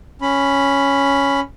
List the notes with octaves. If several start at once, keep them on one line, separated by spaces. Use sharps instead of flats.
C#4 B5